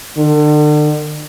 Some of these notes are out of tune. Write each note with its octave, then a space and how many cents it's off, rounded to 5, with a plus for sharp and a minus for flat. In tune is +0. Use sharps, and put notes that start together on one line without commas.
D3 +35